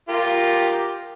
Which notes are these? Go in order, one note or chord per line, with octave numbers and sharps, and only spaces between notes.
F4 G4 A#4